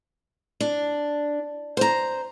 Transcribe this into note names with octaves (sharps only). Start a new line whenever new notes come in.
D4
C5 A#5